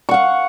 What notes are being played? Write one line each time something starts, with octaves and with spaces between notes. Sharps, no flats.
F5 F#5 C#6